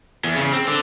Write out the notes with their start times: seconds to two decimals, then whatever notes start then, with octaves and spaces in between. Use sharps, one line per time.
0.24 E2
0.36 C#3
0.53 C4
0.68 D3